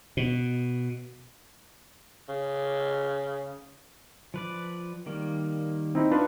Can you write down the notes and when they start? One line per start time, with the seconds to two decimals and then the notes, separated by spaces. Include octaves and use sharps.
0.17 B2
2.28 C#3
4.34 F3 B4 D5
5.06 D#3 G3 A#3
5.95 C4 D#4 E4
6.12 D4 F4 F#4 B4